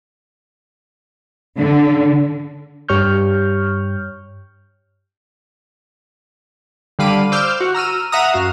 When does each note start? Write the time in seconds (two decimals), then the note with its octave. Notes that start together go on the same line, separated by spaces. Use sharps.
1.59 D3
2.89 G2 G4 C#5 C#6 F6 G6
6.99 D3 G3 F5 B5 D6 D#7
7.32 C5 D6 E6 F6 G6
7.61 F#4
7.75 A#5 E6 F6 D#7
8.12 E5 F#5 A#5 D#6
8.33 F#2 F#4 F5